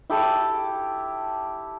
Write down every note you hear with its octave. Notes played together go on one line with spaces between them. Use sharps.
E4 G4 A4 D6